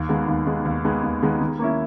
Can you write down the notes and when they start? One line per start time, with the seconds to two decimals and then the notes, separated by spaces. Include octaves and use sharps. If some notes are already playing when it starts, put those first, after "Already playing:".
Already playing: D#2
0.09 D#3 G#3 B3
0.28 D#2
0.46 D#3 G#3 B3
0.65 D#2
0.84 D#3 G#3 B3
1.03 D#2
1.22 D#3 G#3 B3
1.41 D#3
1.59 A#3 C#4 E4